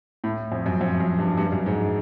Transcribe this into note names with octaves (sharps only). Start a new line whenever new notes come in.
A2
F2
F#2
F2
F#2
G2
G2
F#2
G#2